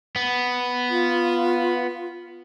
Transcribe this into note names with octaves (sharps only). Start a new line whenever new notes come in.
B3
F4